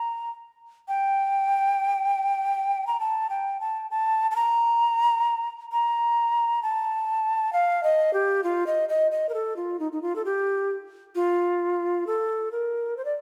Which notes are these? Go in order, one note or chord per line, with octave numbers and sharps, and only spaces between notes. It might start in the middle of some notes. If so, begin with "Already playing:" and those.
Already playing: A#5
G5
A#5
A5
G5
A5
A5
A5
A#5
A#5
A5
F5
D#5
G4
F4
D#5
D#5
D#5
A#4
A4
F4
D#4
D#4
F4
A4
G4
F4
A4
A#4
C5
D5